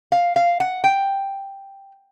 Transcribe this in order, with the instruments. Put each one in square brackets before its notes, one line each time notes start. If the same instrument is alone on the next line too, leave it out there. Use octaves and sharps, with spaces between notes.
[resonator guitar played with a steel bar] F5
F5
F#5
G5